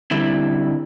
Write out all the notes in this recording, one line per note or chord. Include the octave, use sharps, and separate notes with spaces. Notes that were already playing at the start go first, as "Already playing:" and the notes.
D3 G3 C4 E4